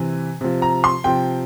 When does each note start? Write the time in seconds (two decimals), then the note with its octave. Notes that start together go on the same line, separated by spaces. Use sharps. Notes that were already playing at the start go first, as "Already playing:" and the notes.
Already playing: C3 E3
0.41 C3 F3
0.62 A#5
0.84 C6
1.04 C3 F3 G5